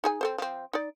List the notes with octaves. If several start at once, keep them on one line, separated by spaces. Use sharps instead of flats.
D#4 G#4 G#5
C4 A4 C5
F3 C4
D#4 D5